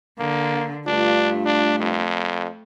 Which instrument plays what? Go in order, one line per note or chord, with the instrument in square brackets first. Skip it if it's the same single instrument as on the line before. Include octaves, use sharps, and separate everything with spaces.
[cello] D3 [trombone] A#3
[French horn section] G2 F4 [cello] A3 [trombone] D4
[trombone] D4
F2